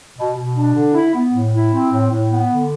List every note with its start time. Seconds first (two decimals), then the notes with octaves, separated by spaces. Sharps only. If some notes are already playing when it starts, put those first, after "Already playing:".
0.17 B2
0.36 B2
0.55 D4
0.75 D3
0.94 E4
1.14 B3
1.33 A2
1.52 E4
1.72 C4
1.91 A2
2.10 A2
2.30 B3
2.49 D3